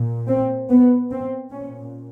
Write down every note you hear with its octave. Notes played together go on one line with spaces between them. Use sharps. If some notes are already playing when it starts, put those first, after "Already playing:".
Already playing: A#2
C4
B3
C4
A#2 C#4